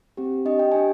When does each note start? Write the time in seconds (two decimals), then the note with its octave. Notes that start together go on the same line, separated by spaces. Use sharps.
0.17 C4 G4
0.45 D4 G4 D#5
0.59 G5
0.72 D4 G4 G#5